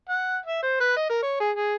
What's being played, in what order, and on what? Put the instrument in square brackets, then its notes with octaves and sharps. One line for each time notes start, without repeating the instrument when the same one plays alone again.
[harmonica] F#5
E5
C5
B4
D#5
A#4
C#5
G#4
G#4